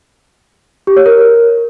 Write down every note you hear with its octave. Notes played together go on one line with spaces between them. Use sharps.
G4
C#5
A#4